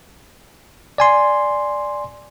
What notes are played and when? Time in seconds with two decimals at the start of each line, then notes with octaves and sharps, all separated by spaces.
0.98 D5 G#5 C6